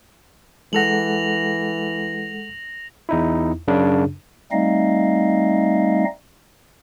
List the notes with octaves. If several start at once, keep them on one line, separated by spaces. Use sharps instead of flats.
E3 G#3 A4 F#5 A#6 F7 F#7
E2 D#4 E4
F#2 C#3 D4
G3 A3 C4 D#4 D#5 F5